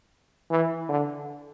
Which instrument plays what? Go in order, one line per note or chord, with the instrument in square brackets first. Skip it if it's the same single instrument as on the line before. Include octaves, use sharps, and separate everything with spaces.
[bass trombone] E3
D3